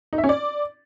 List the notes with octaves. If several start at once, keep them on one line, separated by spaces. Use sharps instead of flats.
D#4
E5
C#4
D5